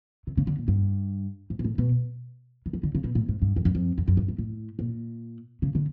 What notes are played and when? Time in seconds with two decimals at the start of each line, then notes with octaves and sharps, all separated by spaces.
0.27 C3
0.37 C#3
0.47 D3
0.58 A#2
0.68 G2
1.50 G#2
1.59 A#2
1.64 A2
1.78 B2
2.66 D#3
2.73 E3
2.83 D3
2.95 C#3
3.04 B2
3.15 A2
3.28 G#2
3.42 G2
3.56 F2
3.65 F#2
3.75 F2
3.98 F2
4.08 F#2
4.17 G2
4.28 G#2
4.38 A2
4.79 A#2
5.62 C#3
5.75 D3